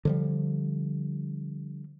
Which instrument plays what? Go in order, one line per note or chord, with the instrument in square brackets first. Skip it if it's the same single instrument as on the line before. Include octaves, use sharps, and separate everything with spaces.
[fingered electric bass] D3 F3 G3